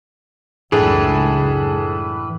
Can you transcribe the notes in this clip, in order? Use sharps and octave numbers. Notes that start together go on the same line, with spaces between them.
C#2 F#2 A2 E3 D4 G#4 A4 B4